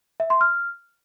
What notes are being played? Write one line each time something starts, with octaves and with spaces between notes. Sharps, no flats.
E5
C6
F6